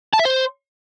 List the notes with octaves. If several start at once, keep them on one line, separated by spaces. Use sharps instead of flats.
A5
E5
C5